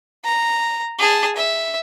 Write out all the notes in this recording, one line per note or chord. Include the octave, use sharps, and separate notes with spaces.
A#5
G#4 A5
E5